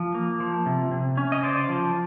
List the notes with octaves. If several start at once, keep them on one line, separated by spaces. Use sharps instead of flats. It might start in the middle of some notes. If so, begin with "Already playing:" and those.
Already playing: F3
A#3
F3
C3
C3
C#4
D#5
C#3 C5 D5
F3